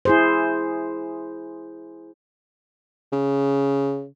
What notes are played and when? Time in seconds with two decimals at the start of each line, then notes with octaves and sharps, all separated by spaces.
0.05 E4 G#4 C5
3.12 C#3